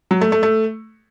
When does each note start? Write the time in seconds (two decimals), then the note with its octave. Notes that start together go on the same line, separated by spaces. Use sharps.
0.11 F#3
0.21 A3
0.32 A3
0.43 A3